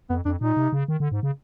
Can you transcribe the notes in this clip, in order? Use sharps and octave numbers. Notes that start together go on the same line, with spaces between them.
F2 B3
F2 D4
A#2 D#4
C3
C#3
D#3
D3
G#2
C#3